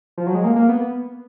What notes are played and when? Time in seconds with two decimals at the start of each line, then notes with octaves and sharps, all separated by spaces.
0.17 F3
0.27 F#3
0.35 G#3
0.44 A#3
0.56 A#3
0.69 B3